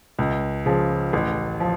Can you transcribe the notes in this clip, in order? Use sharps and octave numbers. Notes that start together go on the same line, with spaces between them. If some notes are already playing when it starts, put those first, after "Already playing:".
C#2
C#3 F3
A1
F3